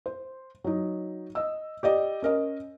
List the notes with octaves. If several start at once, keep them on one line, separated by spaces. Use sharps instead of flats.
C5
F#3 D#4
D#5 E6
G4 D5 D#5
C#4 A#4 D#5